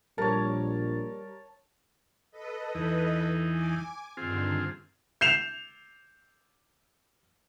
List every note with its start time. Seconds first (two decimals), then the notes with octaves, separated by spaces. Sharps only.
0.18 A#1 G3 A#4 C#5 A5
2.31 A4 B4 D#5
2.75 E2 E3 D#4
3.50 G#5 D6
4.17 G2 D3 D#3 C4 F4 G#4
5.21 G6 C7 E7 F7